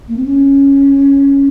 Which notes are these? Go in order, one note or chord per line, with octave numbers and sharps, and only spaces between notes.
A#3
C4
C#4